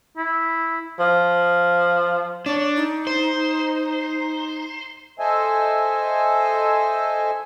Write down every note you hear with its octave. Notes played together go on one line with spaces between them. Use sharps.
E4
F3
D4 C#5
D#4
C5
A4 C5 D#5 E5 G#5